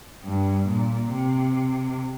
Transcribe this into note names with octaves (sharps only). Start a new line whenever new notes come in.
G2
A#2
C3